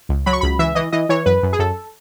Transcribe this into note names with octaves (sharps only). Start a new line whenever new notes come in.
C#2
F#3 B5
C#6
C#2 B5
E3 E5
E3 D#5
E3 D#5
E3 C#5
F#2 B4
F#2
G#4
F#2 A4